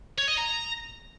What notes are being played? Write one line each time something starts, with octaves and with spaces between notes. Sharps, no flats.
C#5
D#5
A#5